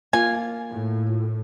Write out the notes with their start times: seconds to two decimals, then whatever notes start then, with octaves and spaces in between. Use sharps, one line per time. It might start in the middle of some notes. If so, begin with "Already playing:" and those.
0.13 A#3 F4 G#5
0.69 A2